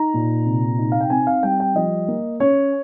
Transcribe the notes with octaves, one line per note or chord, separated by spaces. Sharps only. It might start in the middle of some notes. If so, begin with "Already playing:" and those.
Already playing: D#4 A#5
A#2
C3
D#4
F5
G5
C4 G#5
F5
G3 G5
G5
F3 D#5
A#3
C#4 C#5